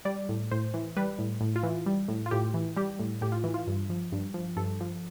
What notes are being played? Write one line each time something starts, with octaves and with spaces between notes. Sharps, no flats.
G3 D5
A2
A2 C5
E3
G3 B4
A2
A2
F4
E3
G3
A2
F4
A2 G4
E3
G3 G4
A2
A2 G4
F4
E3
F4
G2
F3
G2
F3
G2 A4
F3